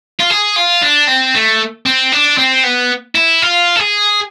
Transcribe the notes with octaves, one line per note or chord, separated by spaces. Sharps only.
F4
G#4
F4
D4
C4
A3
C4
D4
C4
B3
E4
F4
A4
G#4